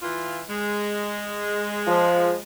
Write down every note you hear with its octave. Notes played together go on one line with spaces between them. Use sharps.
E3 F4
G#3
F3